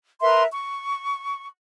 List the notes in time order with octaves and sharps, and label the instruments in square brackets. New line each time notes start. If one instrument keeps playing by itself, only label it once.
[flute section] A#4 B4 E5 C6
C#6